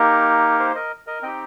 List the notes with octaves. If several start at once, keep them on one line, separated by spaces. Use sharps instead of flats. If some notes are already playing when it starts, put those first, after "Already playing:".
Already playing: A#3 D#4 G4 A#4
C5
A#4 D#5
A#4 D#5
C4 D#4 G4 D#5 G5